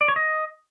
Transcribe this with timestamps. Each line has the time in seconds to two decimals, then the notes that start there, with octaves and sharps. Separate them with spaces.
0.01 D5
0.08 C#5
0.16 D#5